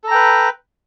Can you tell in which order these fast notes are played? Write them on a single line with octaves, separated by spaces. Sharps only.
A4 A#5 G5 B4